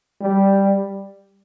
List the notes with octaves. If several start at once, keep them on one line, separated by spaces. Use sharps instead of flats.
G3